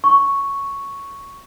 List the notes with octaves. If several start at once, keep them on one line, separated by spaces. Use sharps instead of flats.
C#6